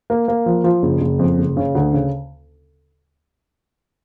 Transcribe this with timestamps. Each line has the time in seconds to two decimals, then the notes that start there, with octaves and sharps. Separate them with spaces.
0.10 A#3
0.28 A#3
0.46 F3
0.64 F3
0.83 F#1
1.01 F#1
1.19 F2
1.38 F#1
1.57 C#3
1.75 D2
1.93 C#3